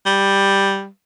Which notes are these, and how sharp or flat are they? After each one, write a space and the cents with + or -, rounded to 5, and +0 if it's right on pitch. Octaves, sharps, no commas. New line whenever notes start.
G3 +5